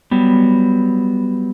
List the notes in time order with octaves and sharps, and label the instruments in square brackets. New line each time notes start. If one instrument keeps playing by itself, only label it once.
[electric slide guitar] F#3 G3 B3